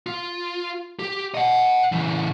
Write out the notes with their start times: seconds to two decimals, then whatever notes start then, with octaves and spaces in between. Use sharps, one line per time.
0.07 F4
0.99 G4
1.34 D#5 F#5
1.92 C#3 E3